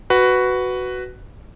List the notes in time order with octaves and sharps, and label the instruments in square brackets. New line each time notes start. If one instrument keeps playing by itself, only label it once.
[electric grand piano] F#4 B4